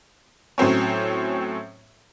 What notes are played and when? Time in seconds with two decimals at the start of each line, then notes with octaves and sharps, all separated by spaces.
0.58 A2 F#3 C4 C#4